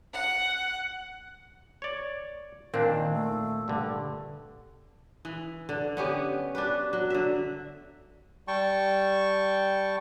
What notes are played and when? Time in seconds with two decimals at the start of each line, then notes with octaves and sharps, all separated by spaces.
0.13 F#5
1.82 C#5 D5
2.74 A#2 D#3 C4 D4
3.11 A3
3.68 G2 D3
5.25 E3
5.69 D3
5.97 B3 C#4 G4
6.55 D4 G4 B4
6.93 F#3
7.10 D3 E5
8.48 G3 G5 A5 C#6